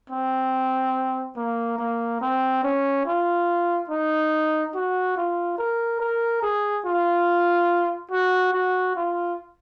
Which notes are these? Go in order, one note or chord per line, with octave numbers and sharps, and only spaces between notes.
C4
A#3
A#3
C4
C#4
F4
D#4
F#4
F4
A#4
A#4
G#4
F4
F#4
F#4
F4